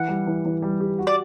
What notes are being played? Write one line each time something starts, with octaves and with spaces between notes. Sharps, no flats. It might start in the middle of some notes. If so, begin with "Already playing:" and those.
Already playing: E3 F#5
G3
E3
E3
G3
G4
F#4
D5